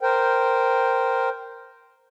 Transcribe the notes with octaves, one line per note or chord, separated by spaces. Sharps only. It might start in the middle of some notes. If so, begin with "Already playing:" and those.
A#4 C5 G5